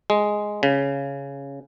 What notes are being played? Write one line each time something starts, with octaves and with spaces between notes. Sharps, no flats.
G#3
C#3